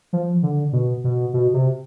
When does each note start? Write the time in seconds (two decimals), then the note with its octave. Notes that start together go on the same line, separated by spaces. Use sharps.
0.13 F3
0.43 D3
0.73 B2
1.04 B2
1.34 B2
1.54 C3